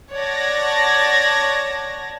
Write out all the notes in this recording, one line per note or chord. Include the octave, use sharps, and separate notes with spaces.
C#5 D5 F#5 A5 G#6 A#6